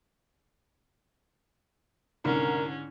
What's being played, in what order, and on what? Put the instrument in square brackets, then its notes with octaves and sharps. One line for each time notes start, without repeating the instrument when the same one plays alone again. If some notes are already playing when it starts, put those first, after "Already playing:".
[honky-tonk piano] C2 [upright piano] G#2 D3 [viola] C#4 [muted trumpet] A#4